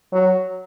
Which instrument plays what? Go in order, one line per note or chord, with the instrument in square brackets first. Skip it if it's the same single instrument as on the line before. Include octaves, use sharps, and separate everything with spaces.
[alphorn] F#3